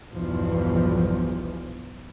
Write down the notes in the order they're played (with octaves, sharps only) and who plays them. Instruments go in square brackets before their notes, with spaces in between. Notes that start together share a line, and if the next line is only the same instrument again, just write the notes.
[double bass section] B1 E2 G2 B2 F3